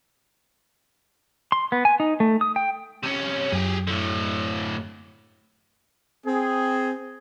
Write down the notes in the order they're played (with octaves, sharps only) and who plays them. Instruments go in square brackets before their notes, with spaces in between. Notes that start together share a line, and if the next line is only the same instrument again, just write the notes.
[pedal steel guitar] C6
B3
G#5
D#4
A3
D#6
G5
[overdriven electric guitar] C3 C#4
[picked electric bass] F#2 [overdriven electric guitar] G4 G#4
[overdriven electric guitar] A2 D3
[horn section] C4 G#4